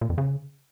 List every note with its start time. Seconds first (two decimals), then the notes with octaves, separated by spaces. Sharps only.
0.01 A#2
0.10 F2
0.18 C#3